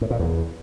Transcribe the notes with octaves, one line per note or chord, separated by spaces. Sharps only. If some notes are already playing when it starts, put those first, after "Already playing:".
A2
A#2
E2